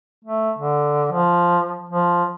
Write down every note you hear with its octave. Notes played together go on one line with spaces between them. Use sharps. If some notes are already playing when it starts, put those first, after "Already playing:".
A3
D3
F3
F3